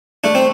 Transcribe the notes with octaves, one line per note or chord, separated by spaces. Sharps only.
A3 D4
C4